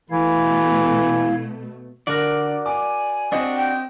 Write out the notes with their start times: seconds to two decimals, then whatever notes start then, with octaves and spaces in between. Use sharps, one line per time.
0.11 B2 E3 A3 E4 F5 G#6
2.07 D3 F#4 A#4 D5
2.66 G#5 D6
3.32 C4 D4 F#4 G4 C5 D#5
3.56 G5